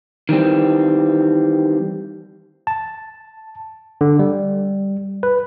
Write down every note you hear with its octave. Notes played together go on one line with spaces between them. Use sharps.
D#3 E3 G3 C4
A5
D3
G3
B4